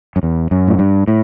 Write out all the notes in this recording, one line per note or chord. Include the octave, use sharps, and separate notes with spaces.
F#2
E2
F#2
A2
G2
A2